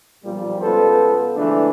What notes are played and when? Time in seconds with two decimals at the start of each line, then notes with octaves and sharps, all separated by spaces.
0.25 B1 A#2 F3 G3
0.61 C#2 B3 F4 A4 B4 C5
1.36 D3 E3 F3 G#3 A3 D4